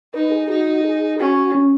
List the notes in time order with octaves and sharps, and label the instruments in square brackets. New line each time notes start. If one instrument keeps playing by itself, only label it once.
[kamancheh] D#4 [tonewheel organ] B4
[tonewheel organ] G#4
[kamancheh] D#4 [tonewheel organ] F#4
[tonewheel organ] G#4
[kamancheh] C#4 [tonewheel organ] F#4
[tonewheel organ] C#4